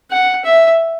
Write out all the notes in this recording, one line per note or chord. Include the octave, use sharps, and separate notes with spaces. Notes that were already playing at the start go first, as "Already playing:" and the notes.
F#5
E5